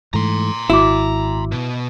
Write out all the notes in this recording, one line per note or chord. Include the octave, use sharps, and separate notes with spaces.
G#2 E3 A3 A#5 C6
G#1 E4 F#4 D6
B2